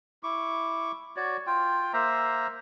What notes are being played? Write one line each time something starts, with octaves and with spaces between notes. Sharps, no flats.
E4 C#6 D6
F#4 C#5 D5
F4 G5
A#3 C5 E5 A#5